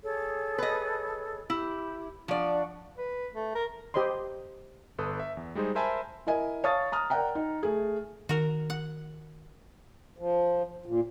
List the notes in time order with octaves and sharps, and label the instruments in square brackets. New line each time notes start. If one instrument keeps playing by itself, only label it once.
[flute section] G#4 A4 C#5
[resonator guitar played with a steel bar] B4 D#5
[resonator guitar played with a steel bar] E4 [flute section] G4
[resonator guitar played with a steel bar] F3 D5 [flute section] D4 F#5 C#6
[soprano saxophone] B4
A3
A#4
[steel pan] G4 C5 D#5 B5 C6
[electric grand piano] G1 A4 B4 D#6
E5
E2
G3 G#3 D#4 G#4 C5
A#4 C5 E5 G#5 A5 B5
[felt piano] E4 A#4 D#5 G#5
C#5 F5 A5 C#6 D#6 A6
A#5 D#6 F6
A#4 D5 F#5 G5 A#5
D#4
A3 G#4
[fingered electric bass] D#3 [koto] F#4 A#4
[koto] F#5
[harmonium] F3
A#2